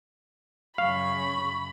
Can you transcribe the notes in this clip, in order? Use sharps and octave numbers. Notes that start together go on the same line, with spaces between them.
F#2 C#3 F5 B5 C#6